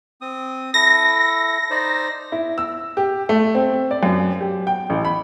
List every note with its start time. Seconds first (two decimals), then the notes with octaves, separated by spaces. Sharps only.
0.21 C4 D#6
0.74 E4 A4 A#6
1.70 D#4 C5 D5
2.32 E4
2.58 E6
2.97 G4
3.29 A3
3.55 C4
3.91 D5
4.03 F#2
4.41 G4
4.67 G5
4.90 A1
5.05 B5